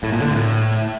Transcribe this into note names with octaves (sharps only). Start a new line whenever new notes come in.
A2
A#2
D3
A2